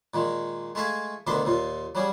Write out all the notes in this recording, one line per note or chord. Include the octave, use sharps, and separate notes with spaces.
A#2 D#3 G#3
G#3 A3 A4 E5 F5 G#5
D2 B2 D#3 D4 E5 C6
D#2 A#2 F4
F#3 G3 C#4 G#4